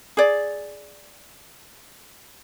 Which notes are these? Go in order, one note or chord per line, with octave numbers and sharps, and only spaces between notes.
G#4 D5